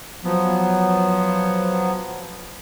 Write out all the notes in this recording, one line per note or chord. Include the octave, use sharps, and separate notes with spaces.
F3 F#3 B3